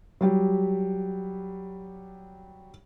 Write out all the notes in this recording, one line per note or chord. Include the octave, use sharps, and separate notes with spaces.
F#3 G3 G4